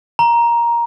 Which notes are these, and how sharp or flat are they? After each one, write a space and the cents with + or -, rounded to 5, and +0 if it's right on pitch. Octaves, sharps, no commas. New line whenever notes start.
A#5 +10